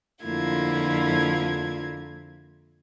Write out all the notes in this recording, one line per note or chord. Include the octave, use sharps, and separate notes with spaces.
F2 D3 A#3 E4 F4 G#6